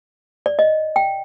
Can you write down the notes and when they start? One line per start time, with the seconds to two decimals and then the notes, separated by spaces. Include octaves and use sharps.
0.46 D5
0.59 D#5
0.96 G5